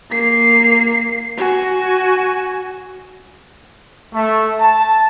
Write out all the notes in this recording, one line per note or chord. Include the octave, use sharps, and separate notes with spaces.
A#3 C7
F#4 G#5
A3
A5